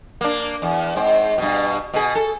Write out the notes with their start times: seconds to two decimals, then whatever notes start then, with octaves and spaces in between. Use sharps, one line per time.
0.21 A#3 D4
0.62 E2
0.96 G#2 C4
1.38 G2 B2
1.94 B2 G#4
2.15 A4